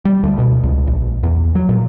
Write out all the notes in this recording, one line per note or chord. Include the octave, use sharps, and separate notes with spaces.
G3
D2
B2
C#2
A#1
E2
F#3
A#2